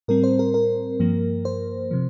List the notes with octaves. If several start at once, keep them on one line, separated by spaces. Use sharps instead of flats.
A2 G3 C4 A#4
C5
A#4
A#4
G2 F3 A#3
C5
C3 F3